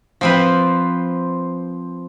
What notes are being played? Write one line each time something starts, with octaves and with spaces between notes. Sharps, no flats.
F3 C4 B4